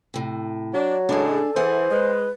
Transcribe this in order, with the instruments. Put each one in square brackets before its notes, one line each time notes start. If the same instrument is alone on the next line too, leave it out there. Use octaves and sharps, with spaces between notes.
[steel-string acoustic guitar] A2 C3
[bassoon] F#3 [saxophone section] D4
[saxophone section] A2 C#3 G#3 [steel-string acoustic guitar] D4 G#4 [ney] A4
[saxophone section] E3 [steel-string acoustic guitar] G#4 F#5 [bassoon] C5
[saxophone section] G#3 [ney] B4